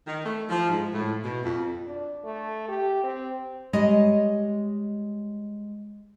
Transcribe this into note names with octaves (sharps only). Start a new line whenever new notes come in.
D#3
A3
F3
G#2
A2
B2
F2
D4
A3
G4
C4
G3 G#3 C#5 D#5